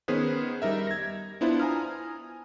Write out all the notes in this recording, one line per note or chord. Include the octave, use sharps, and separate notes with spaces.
D#3 B3 C#4 G#4 B4 C5
G3 D#4 A#4 E5
G#6 A#6
B3 D4 E4 F4 C5
G#5 A#5 D#6 F6